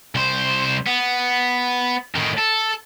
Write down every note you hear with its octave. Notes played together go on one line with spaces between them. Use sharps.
C2 C5
B3
A2 D#3
A4